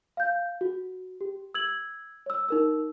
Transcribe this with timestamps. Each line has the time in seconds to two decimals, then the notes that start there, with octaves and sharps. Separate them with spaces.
0.17 F5 G6
0.61 F#4
1.21 G4
1.54 E6 G#6 F#7
2.26 C#5 E6
2.49 D#4 A#4 E6